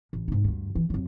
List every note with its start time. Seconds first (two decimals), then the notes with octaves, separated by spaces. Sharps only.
0.13 A1
0.28 G#2 D#4
0.44 D2 G2
0.75 E3
0.90 F2 F#3